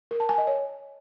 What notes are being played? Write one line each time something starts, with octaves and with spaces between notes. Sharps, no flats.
A#4
A5
G#5
D#5
C#5